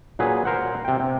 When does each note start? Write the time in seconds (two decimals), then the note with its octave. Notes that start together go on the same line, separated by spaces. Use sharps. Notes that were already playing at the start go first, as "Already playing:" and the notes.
0.19 A#2 F#3 G#4 B4
0.45 A#4 C5 F#5
0.85 C3 G5
1.00 C3